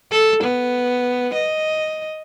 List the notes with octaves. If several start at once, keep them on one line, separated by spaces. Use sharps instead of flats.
A4
B3
D#5